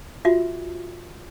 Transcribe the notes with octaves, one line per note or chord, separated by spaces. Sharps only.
F4 F#4 E5